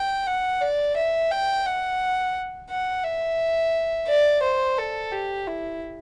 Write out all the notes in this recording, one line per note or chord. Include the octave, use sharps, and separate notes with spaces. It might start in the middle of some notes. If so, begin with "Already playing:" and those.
Already playing: G5
F#5
D5
E5
G5
F#5
F#5
E5
D5
C5
A4
G4
E4